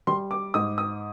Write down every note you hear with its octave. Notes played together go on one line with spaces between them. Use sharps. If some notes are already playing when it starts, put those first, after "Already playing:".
G3 C6
D6
G#2 D#6
D#6